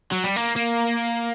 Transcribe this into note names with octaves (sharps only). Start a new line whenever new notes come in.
F#3
G3
A#3
A#3